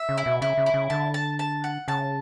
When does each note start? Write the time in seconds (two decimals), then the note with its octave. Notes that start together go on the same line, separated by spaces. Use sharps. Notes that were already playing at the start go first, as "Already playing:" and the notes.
Already playing: E5
0.09 C#3
0.18 E4
0.26 B2
0.41 C#3 E4
0.57 C#3
0.66 E4
0.74 C#3
0.90 D3 A5
1.14 A5
1.39 A5
1.64 F#5
1.88 C#3 A5